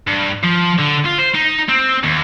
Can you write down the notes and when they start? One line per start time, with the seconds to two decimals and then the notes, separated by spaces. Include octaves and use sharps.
0.07 G2
0.43 F3
0.78 D3
1.05 F4
1.18 C5
1.34 D#4
1.69 C4
2.03 D#2